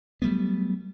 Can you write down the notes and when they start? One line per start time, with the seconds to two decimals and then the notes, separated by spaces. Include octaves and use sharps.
0.22 F#3 G3 A3 B3